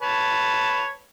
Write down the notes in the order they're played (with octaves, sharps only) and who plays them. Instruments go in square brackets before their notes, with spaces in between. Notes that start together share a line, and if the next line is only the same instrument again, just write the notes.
[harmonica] B4 C#5 A5